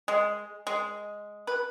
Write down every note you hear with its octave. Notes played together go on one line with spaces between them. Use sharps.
G#3
G#3
B4